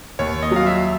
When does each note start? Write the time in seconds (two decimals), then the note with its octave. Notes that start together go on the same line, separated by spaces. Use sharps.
0.19 D#2 C#5
0.43 D#5
0.51 F#3 F5
0.66 E5